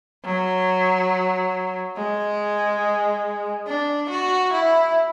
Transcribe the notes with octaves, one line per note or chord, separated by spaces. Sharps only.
F#3
G#3
D4
F#4
E4